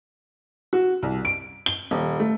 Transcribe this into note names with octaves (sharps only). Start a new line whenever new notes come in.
F#4
C2
D7
G7
D#1
A3